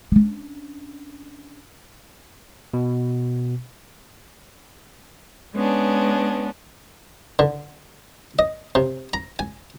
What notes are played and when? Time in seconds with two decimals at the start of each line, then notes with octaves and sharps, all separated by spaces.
0.12 C#4 D4
2.74 B2
5.54 G#3 B3 C#4 D4
7.39 D3
8.39 D#5
8.75 C3
9.13 A#5
9.39 G#5